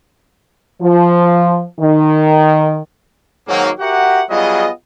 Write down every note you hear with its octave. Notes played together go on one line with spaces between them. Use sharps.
F3
D#3
G#2 D#3 F#3 A#3
F#4 G4 A#4 E5 F#5
F#3 G3 B3 F4 G#4 D#5